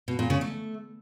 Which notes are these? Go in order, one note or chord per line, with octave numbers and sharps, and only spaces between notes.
B2
A#2
C#3
A3